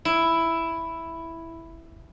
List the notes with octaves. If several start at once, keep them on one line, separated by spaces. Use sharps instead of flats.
E4